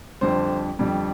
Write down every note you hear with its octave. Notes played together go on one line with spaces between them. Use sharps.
F2 D3 G3 C5
F2 D3 G3